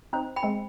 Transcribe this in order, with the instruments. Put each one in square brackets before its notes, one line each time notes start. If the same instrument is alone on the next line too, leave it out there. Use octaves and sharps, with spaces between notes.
[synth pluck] C4 D#4 [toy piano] C5
[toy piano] G5 B5
[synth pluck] G#3 C4